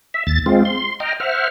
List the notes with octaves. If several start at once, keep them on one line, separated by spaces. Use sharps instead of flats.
E5
D#2 A6
G#3 C4 F4
C6
D#5 G5 A#5 F6
C5 E5 F#5 F6